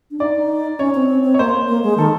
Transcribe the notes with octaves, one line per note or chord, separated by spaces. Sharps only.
D4
D#4 D5
D#4
C#4 C#5
C4
C4
C4
C#5
A#3 C5
A#3
G#3
D#3 A4